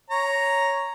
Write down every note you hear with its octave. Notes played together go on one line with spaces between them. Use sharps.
C#5 A#5